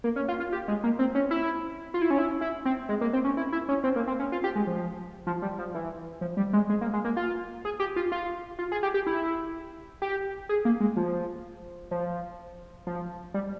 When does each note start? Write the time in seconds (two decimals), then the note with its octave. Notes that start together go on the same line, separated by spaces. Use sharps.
0.04 A#3
0.16 C#4
0.28 F4
0.40 F4
0.52 G4
0.68 G#3
0.84 A#3
0.99 C4
1.15 C#4
1.31 E4
1.94 F4
2.02 E4
2.10 C#4
2.18 E4
2.41 E4
2.65 C4
2.89 G#3
3.01 A#3
3.13 C4
3.24 C#4
3.37 E4
3.52 E4
3.69 C#4
3.84 C4
3.96 A#3
4.08 C4
4.19 C#4
4.32 F4
4.44 G4
4.56 G#3
4.67 F3
5.27 F3
5.42 G3
5.59 F3
5.75 E3
6.21 F3
6.37 G3
6.53 G#3
6.69 G#3
6.81 A#3
6.93 G#3
7.04 A#3
7.17 F4
7.65 G#4
7.80 G4
7.96 F4
8.12 F4
8.59 F4
8.72 G#4
8.83 G4
8.94 G4
9.07 E4
10.02 G4
10.49 G#4
10.65 A#3
10.80 G#3
10.97 F3
11.91 F3
12.87 F3
13.34 G3